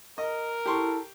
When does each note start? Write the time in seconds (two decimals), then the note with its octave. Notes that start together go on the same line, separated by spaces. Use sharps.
0.18 A#4 D#5
0.66 E4 G4 A4 C6 C#6